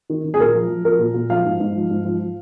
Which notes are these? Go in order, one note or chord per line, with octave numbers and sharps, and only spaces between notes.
D#3
D#3
G#4
A#2 A#4
F3
F3
F3 A#4
A#2
A#2
F3 F5
G#2
G#2
F3
G#2
F3
F3